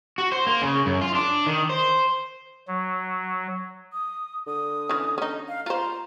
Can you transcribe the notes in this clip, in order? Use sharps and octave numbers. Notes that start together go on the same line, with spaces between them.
F#4
C5
A#3
C#3
F#2
F4
D4
D#3
C5
F#3
D#6
D3 D#6
E3 C#4
C#4 D#4
F5
F4 C5 A#5